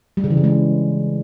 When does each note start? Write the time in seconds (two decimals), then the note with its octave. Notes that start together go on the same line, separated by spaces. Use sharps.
0.17 G3
0.24 C#3
0.31 E3
0.37 C#3
0.44 G#3